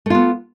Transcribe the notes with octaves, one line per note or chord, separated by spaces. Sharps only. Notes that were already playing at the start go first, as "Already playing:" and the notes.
A3 B3 F4